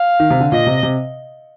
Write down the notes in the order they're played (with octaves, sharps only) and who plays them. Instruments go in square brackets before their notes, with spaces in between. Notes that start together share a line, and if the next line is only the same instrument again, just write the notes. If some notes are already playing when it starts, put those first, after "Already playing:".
Already playing: [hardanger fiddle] F5
[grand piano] D#3
C3
D3
[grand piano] A#2 [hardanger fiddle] D#5
[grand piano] C3
C3